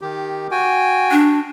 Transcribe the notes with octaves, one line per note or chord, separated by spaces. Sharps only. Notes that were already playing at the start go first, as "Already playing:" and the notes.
D#3 G4
F#4 G5 G#5
D4